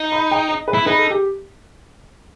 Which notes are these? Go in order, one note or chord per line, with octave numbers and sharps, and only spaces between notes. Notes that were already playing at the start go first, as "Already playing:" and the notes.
Already playing: D#4
B5
G5
D#5
B4
E4
D#4 B4
A4
G4